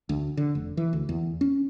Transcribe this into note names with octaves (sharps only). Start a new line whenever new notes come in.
D2
D3
F1
E3
D2
E2
C#4